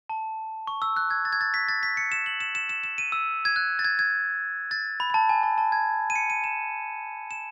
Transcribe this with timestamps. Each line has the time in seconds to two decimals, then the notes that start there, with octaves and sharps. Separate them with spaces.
0.09 A5
0.67 C#6
0.82 E6
0.97 F#6
1.11 G#6
1.25 A6
1.33 G#6
1.41 A6
1.54 B6
1.69 A6
1.83 B6
1.97 C#7
2.12 E7
2.26 F#7
2.40 E7
2.55 E7
2.69 E7
2.84 E7
2.98 D#7
3.12 E6
3.45 G#6
3.56 F#6
3.79 A6
3.84 G#6
3.99 G#6
4.71 A6
5.00 B5
5.10 B5
5.14 A5
5.29 G#5
5.43 A5
5.58 A5
5.72 G#6
6.10 D#7
6.15 C#7
6.30 D#7
6.44 E7
7.31 E7